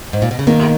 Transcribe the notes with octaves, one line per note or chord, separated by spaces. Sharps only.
G#2
A#2
B2
C#3
B2 D#3 A#3